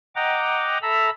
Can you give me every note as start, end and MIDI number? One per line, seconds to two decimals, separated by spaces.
0.16 0.78 75
0.16 0.78 78
0.16 0.78 79
0.16 0.78 82
0.16 0.78 86
0.82 1.10 69
0.82 1.10 76
0.82 1.10 82
0.82 1.10 83
0.82 1.10 88